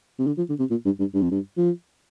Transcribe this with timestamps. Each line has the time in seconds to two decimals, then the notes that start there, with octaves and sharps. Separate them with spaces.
0.19 C3
0.27 D3
0.38 F3
0.49 D3
0.59 C3
0.70 A#2
0.85 G2
0.99 G2
1.14 G2
1.22 F2
1.31 G2
1.57 F3